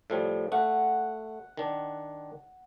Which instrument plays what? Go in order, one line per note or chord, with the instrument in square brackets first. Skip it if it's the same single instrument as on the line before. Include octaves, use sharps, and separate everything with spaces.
[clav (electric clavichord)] A2 F3 G3
[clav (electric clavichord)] A3 [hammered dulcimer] F#5
[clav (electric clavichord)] D#3 D4